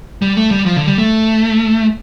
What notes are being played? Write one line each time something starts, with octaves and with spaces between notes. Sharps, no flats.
G3
A3
G3
F3
D3
G3
A3